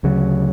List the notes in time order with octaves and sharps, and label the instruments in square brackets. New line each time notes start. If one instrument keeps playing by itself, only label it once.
[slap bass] D2 C#3 F#3